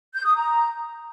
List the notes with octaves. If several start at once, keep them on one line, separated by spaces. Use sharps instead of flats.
G6
D#6
A#5